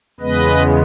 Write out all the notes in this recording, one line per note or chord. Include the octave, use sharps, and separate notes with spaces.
E2 C#3 G#3 B3 B4 D#5